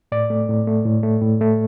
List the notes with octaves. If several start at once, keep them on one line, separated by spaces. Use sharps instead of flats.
A2 D5
A3
A2
A3
A2
A3
A2
A3